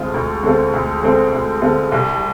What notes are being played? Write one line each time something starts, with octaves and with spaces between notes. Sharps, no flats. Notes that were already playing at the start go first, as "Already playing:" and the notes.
Already playing: D2 D3 G#3 C4 F4
D2
D3 G#3 C4 F4
D2
D3 G#3 C4 F4
D2
D3 G#3 C4 F4
C2